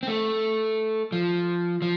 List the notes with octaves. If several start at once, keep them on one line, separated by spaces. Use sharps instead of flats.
C4
A3
F3
F3